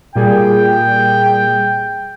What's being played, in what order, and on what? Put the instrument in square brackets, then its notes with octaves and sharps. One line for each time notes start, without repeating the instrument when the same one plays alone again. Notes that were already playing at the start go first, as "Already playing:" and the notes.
[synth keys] A#2 G3 G#4 [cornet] G5